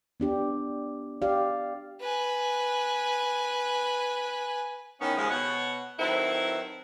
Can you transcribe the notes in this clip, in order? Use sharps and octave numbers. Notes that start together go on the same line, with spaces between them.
B3 D4 G4
G4 D5 F5
B4 G#5
D#3 E3 B3 C#4
D#2 C#3 F3 G#3
B2 C#5 F#5
D#3 F#3 C4 E4 A4 B4